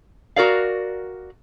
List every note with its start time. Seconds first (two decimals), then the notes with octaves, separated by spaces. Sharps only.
0.36 F#4 A#4 D5 F5